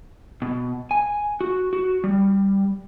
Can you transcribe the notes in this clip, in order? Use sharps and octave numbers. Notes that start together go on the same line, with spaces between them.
B2
G#5
F#4
F#4
G3